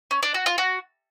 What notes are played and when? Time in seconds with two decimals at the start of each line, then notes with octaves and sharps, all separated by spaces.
0.11 C#4
0.23 D4
0.34 F#4
0.46 F4
0.58 F#4